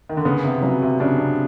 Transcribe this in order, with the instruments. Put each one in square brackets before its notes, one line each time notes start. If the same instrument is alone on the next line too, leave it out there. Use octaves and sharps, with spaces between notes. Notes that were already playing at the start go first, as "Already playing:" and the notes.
[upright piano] D#3
D3
[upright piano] C#3 [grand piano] B3
[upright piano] C3
[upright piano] C#3 [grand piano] F#3
[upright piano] C3
[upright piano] C#3 [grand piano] D4
[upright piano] C3